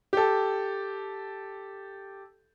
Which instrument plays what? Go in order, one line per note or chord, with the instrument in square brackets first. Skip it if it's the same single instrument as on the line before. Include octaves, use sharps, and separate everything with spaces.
[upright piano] G4 A4